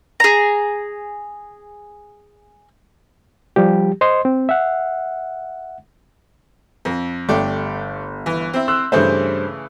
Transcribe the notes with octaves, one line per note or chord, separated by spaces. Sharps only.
G#4 A#5
F3 G3 G4
C5 D#5 C6
C4
E5 F#5
F2
G1 A3 D4 G4
E3
C4 E4
C6 E6 F#6
G2 C#3 E3 A3 C5